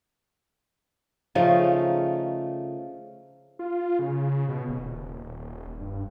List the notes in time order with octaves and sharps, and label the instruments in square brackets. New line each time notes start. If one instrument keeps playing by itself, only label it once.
[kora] C#3 F3 A3 D#4
[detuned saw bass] F4
C#3
B2
D#1
G2